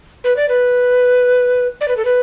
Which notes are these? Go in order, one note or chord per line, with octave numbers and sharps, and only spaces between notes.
B4
D5
B4
D5
B4
A4
B4